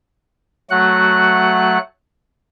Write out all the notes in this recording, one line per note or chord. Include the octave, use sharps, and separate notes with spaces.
F#3 A3 F#4 F#5 F#6